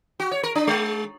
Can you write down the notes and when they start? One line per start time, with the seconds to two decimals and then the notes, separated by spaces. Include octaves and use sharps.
0.20 F#4
0.31 C#5
0.43 A#4
0.55 D4
0.67 G#3